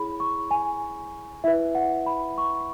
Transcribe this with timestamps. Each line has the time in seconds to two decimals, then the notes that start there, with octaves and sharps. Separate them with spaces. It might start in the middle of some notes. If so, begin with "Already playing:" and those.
Already playing: E4 G#4 C#5 B5
0.20 C#6
0.51 G#5
1.44 E4 B4 E5
1.75 F#5
2.06 B5
2.38 C#6